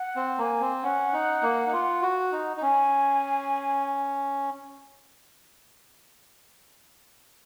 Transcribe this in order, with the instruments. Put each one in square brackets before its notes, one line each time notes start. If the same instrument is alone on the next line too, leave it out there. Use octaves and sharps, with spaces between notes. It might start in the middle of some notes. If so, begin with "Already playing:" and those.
Already playing: [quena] F#5
[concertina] C4
[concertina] A#3 [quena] A#5
[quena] G#5
[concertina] C4
[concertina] C#4 [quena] F#5
[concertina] D#4
A#3
D#4
F4
F#4
D#4
D#4
[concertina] C#4 [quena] G#5